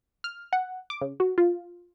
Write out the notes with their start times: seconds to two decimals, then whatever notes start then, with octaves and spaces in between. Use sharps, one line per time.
0.24 F6
0.53 F#5
0.90 D6
1.01 C#3
1.20 F#4
1.38 F4